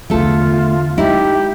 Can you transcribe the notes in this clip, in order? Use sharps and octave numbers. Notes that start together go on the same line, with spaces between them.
E2 D3 A3 F4 A4
G#3 D#4 E4 G4